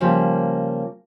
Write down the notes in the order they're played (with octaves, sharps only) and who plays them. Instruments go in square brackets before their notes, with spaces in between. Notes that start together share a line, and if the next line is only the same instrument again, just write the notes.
[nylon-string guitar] C#3 F3 G3 A#3